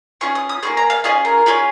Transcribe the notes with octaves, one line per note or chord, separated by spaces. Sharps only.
C#4 F4 G#4 C#6
D#6
D#6
A#3 F4 G#4 C#6
A#5
F5
C#4 F4 G#4 D#5
A#4
C#4 F4 G#4